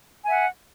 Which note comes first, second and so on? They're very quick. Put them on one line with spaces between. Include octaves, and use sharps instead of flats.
G#5 E5 F#5